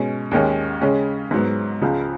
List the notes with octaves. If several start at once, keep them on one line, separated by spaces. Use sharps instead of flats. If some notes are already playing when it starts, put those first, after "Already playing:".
Already playing: B2 G#3 C#4
D#2 D#3 G#3 C#4
C#3 G#3 C#4
G#2 F#3 B3
C#2 C#3 F3